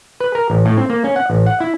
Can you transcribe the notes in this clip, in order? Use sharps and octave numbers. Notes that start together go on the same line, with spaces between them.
B4
A#4
A1
A2
C4
A#3
C#4
F#5
A1
F#5
E4